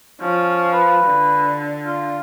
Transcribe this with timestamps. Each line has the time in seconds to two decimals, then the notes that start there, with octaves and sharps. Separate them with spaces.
0.21 F3 C#4
0.72 B4
1.04 D3
1.86 F4